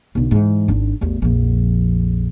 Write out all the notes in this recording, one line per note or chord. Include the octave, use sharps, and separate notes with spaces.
B1 D3
G#2 E3
G#1 D4
A1 E2
A#1 F2